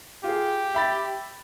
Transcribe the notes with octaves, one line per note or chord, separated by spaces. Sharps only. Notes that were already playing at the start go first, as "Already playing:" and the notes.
F4 G4 G#4
E5 B5 A6